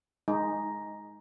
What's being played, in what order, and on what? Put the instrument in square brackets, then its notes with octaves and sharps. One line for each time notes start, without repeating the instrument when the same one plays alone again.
[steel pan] G#3 D#4